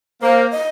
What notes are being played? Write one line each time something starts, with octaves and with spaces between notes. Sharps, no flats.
A#3 C5
D#5